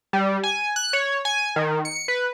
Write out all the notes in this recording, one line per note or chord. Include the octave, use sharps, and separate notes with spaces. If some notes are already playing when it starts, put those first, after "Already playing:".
G3
G#5
F#6
C#5
G#5
D#3
C#7
B4